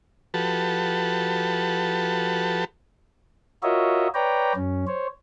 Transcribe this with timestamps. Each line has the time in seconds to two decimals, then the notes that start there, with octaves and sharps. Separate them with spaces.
0.34 F3 F#4 G4 A4 B4 A5
3.63 F4 F#4 A#4 C#5 D#5 E5
4.14 B4 C#5 D5 G5 A#5
4.56 F#2 C#4
4.87 C5 C#5